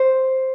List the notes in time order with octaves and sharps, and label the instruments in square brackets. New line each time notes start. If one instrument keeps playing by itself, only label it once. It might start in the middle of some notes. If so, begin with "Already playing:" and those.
Already playing: [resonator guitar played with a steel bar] C5